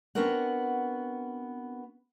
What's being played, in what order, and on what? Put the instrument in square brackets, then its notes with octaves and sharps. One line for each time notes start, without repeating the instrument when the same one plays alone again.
[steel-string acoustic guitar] B3 C4 D4 F#4 A#4 F#5